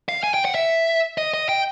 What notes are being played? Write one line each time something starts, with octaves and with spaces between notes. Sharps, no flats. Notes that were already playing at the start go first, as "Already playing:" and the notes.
F5
G#5
G5
F#5
E5
D#5
D#5
G5